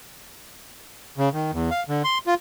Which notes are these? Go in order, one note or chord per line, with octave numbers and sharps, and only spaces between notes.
C#3
D#3
E2
F5
D3
C6
F4